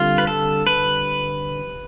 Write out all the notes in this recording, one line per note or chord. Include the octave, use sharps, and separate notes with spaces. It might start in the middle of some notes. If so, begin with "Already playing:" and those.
Already playing: D3 G3 C4 F4
B4
A4
B4